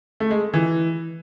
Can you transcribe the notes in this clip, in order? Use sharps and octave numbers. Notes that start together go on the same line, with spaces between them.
A3
G#3
E3